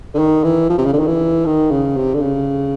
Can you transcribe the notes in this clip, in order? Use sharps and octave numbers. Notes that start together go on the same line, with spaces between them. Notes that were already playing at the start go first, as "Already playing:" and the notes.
D3
D#3
E3
F3
C3
C#3
D3
D#3
E3
D#3
C#3
C3
D3
C#3